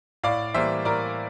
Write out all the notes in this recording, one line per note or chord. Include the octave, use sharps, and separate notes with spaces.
A2 D5 F5
E3 G3 A#3 C5 E5
A2 A#4 D5